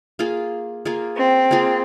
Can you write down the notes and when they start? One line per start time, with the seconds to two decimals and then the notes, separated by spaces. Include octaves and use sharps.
0.19 A#3 F4 G#4
0.85 A#3 F4 G#4
1.18 C4
1.51 A#3 F4 G#4